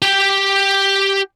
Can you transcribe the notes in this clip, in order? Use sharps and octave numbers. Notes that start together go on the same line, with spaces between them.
G4 G5